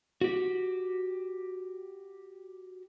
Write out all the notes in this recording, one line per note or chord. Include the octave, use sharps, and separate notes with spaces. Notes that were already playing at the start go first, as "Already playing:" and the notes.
F#4 G4